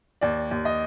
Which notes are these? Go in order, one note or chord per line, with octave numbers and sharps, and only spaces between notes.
D#2 D5
D#2
D#5